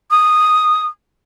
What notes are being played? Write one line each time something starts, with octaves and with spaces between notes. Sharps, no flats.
D#6